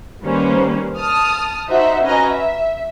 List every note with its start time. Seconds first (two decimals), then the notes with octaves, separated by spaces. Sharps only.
0.23 D#3 G3 A#3 C#4 B4 C5
0.98 A5 D#6 F6
1.68 D#4 F#4 C5 E5 F#5
2.04 C#4 F#4 B4 D#5 G#5 A#5
2.32 E5